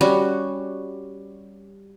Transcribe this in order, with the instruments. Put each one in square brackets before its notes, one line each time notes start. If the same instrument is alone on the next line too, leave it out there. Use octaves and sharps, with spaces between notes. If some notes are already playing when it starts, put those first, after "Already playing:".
[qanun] G3 C#4 F#4